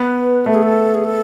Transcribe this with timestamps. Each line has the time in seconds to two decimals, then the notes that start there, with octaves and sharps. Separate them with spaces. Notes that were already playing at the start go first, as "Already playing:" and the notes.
Already playing: B3 B4
0.46 A3 A4
0.54 G#4
0.63 A4
0.94 G#4
1.05 A4